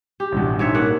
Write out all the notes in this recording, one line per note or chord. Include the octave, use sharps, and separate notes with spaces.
G4
A1 G2 B2
G#2 C#5 E5
A#3 F#5